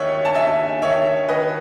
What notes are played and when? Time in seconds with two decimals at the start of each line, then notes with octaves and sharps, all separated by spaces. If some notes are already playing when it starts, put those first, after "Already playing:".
Already playing: D#2 D#3 C#5 E5 F#5
0.25 A5
0.34 D#2 E5 G#5
0.82 D#3 C#5 E5
1.28 D#3 B4 D#5